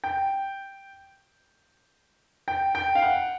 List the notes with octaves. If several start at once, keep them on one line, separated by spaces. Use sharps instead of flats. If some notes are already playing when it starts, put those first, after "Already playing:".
G5
G5
G5
F5
F#5